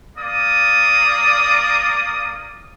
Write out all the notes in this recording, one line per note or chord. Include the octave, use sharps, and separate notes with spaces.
A#3 D5 D#6